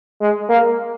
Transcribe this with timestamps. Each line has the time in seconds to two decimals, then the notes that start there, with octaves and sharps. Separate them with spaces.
0.21 G#3
0.49 A#3